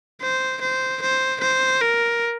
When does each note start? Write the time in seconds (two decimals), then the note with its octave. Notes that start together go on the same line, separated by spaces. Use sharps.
0.22 C5
0.61 C5
1.02 C5
1.41 C5
1.81 A#4